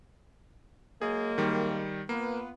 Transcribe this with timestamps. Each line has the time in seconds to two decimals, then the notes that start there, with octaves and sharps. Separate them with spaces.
1.02 F#3 G#3 A#3 G#4
1.38 D#3 G3
2.09 A#3 B3 F4 B4